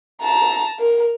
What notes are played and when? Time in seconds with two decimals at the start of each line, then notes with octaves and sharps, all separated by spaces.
0.22 A5 A#5
0.79 A#4